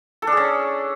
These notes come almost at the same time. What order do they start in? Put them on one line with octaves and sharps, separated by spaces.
A4 D4 G#4 C#4